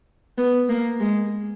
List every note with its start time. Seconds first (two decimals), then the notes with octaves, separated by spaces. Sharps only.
0.38 B3
0.69 A#3
1.00 G#3